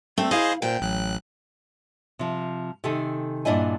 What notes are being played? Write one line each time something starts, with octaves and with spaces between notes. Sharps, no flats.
G3 A3 C4
E4 G#4 C5 D#5 F5
A#2 C5 G5
A1 F#3 F#6
C3 F3
C3 D#3 A4 G#5
G2 A#2 D4 E4 D#5 G#5